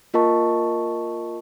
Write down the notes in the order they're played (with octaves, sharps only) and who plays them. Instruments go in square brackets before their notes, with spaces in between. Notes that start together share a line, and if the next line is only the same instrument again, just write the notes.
[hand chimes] A#3 F4 A#4 D#5 A5 C#6